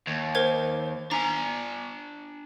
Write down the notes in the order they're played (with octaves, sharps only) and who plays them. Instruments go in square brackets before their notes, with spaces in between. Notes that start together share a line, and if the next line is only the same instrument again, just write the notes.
[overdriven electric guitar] D#2
[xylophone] A#4 C5 G#6
[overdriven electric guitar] D4 G#5 [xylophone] A#5